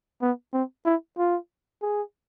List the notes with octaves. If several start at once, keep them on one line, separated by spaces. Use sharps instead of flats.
B3
C4
E4
F4
G#4